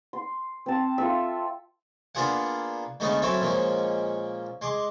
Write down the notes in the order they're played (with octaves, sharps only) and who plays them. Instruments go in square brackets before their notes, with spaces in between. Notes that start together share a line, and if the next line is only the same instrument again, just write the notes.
[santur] C6
C4 A5
F4 A4 E5
[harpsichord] A#3 B3 D4 F4 G#4 F#5
D3 G#3 A3 B3 C#4 D#4
F#3 C4 C#4 E4 F#4 A4
A#2 F3 G#3 C#4
G#3 C6 D6